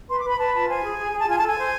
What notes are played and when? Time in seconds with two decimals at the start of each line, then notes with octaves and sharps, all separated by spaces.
0.09 B4 C6
0.19 B4 D6
0.29 B5
0.38 B4 A5
0.54 F4 A5
0.68 C5 G#5
0.84 G#4
0.98 G#4
1.12 G#4
1.19 A5
1.27 F4 G#5
1.37 A5
1.42 A4 G#5
1.57 C5